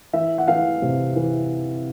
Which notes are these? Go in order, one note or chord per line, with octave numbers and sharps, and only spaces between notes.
E3 E5
F#5
E3 F5
C3
E3